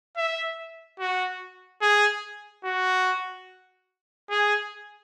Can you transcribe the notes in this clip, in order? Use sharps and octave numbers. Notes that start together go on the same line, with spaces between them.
E5
F#4
G#4
F#4
G#4